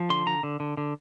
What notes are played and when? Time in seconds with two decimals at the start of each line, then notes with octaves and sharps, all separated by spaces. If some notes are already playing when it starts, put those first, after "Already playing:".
Already playing: F3
0.10 D3 C6
0.26 D3 A#5
0.43 D3
0.60 D3
0.77 D3